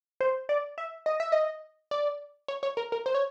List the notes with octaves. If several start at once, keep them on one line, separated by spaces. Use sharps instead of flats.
C5
D5
E5
D#5
E5
D#5
D5
C#5
C#5
A#4
A#4
C5
C#5